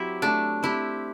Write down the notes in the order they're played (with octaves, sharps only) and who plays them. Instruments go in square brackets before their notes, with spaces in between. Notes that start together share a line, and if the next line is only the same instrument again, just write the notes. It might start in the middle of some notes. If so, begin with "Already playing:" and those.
Already playing: [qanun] F#3 C4 G4 [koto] E4
[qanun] A3 [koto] D4
[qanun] C4 G4 [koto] E4